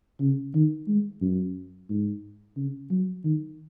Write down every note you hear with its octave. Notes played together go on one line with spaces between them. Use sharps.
C#3
D#3
G#3
F#2
G#2
C#3
F#3
D#3